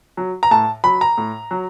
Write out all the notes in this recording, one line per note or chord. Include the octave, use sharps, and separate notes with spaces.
F#3
A#5
A2 A5
F#3 B5
A#5
A2
F#3